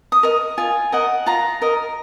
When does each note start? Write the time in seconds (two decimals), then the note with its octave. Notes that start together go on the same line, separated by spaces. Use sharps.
0.12 D#6
0.23 A#4 D#5
0.58 F4 G#5
0.92 A#4 D#5 F#5
1.26 F4 A#5
1.62 A#4 D#5